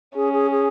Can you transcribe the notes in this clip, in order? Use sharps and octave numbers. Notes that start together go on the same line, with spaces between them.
C#4 G#4
G#4
G#4